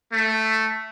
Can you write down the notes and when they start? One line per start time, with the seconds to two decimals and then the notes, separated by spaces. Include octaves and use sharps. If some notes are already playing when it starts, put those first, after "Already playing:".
0.13 A3